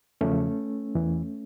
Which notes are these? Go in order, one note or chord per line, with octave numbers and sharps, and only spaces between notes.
E2 C#3 F3 A3 C#4
E2 E3